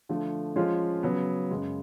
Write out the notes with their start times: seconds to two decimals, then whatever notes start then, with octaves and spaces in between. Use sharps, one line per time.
0.09 D3 F3 A3
0.56 F3 G#3 C#4 F4
1.03 C#3 F#3 B3
1.51 F#2 C#3 G#3